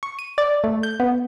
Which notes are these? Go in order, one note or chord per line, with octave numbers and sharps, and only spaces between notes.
C#6
D#7
D5
A3
G6
B3